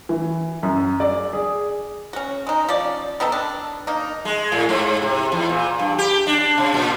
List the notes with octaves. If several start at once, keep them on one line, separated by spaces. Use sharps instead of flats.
E3
F#2
D5
G#4
C#4 F#4
G#3 D#4
F3 C#4 D5
D#3 B3 D#4 A4
D4
A#3 D#4
G#3
A2
G#2
C3
E2
A#2
G2
G4
D4
C3
A#2